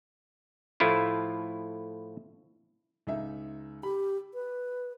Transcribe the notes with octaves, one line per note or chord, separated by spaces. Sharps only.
A2 F3 A3 E4 F4
C#2 D#4 E5
G4 B5
B4